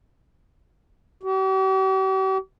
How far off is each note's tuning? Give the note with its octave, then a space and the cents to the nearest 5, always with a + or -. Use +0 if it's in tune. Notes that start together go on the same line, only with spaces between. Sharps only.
G4 -45